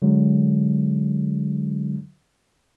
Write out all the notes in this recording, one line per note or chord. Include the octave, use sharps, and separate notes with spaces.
D3 F#3 G#3